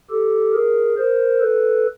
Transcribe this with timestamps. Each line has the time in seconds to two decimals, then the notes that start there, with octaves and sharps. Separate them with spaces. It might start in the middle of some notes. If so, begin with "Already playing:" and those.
0.10 G4 A4
0.54 G#4 A#4
0.98 A#4 C5
1.41 A4 B4